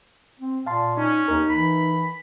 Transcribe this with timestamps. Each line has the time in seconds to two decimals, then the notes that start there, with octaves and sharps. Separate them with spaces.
0.40 C4
0.66 A#2 F5 A5 C6
0.97 C#4 D#4
1.28 D#2 D#4 A#4
1.50 E3 B5